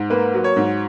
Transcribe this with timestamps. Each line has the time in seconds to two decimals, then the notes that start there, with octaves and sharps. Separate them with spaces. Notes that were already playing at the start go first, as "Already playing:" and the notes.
Already playing: G#2
0.10 A#3 B4
0.34 F#3
0.44 C#5
0.56 G#2